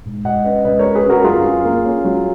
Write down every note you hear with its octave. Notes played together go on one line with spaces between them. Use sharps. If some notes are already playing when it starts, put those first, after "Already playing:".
G#2
G#2 D#5 F#5
C#4 B4 D#5
C#2 B4 D#5
A#4 C#5
G#3
G#4 B4
C#3 F#4 A#4
F#2 F4 G#4
F#2
A#3
C#4
F#3